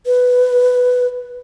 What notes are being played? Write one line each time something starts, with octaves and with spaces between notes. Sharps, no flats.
B4